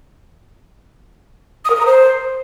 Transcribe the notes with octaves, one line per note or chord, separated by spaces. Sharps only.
D#6
A#4
D#6
A#5
C5